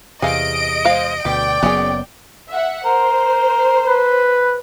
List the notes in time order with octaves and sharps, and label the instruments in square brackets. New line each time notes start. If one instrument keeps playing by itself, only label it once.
[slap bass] E2 C3 [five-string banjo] G#4 F5 [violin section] D#5 D7
[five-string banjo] G#3 C5 F5
[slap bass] D2 B2 [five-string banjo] G4 [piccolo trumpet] D5 [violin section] G5
[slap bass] F#1 F#3 B3 [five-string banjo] C#4 G#4
[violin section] E5 F#5
[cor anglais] A#4 [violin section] C5
[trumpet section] B4